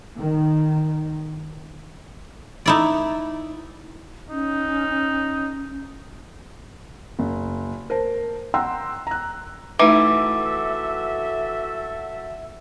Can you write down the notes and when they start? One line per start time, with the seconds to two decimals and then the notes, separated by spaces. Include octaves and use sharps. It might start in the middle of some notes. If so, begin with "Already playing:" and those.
0.19 D#3
2.66 D#4 E4 D5
4.30 C#4 D#4
7.19 F#1
7.90 A#4 C5 A5
8.54 F#5 G5 A#5 C6 E6
9.07 A#5 F#6
9.79 E3 A3 D#4 F#4 A4 E5 D6